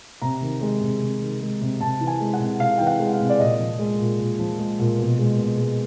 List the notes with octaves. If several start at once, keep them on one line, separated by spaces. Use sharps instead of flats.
C3 A#5
D#3
G#3
C3
C3
D#3
G#3
C3
C3 A5
E3
G#5
G#3
F#5
C3
C3 F5
E3 G5
F#5
G#3
F5
C3
D5
A#2 D#5
F3
G#3
A#2
A#2
F3
G#3
A#2
B2
G#3
B2
G#3